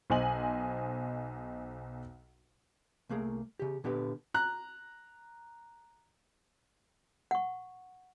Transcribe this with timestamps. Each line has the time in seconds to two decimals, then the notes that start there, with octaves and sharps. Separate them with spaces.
0.10 B1 C5 D#5 G#5 F#7
3.09 C2 A3 A#3 G#4
3.59 C#3 G4
3.84 A#2 D3 B3 G4 B4
4.34 A#5 F#6
7.31 F#5 C#6